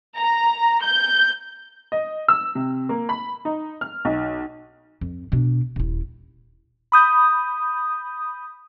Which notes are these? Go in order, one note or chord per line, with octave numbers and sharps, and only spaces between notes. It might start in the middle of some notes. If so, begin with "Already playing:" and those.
A#5
G6
D#5
E6
C3
A#3
B5
D#4
F6
B1
F2
B2 D4
D#1 E4
B5 D#6 G6